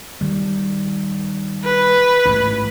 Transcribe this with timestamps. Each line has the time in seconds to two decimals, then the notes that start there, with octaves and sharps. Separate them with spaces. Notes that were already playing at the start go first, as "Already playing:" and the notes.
0.21 D#3 G3
1.65 B4
2.25 A1 G#2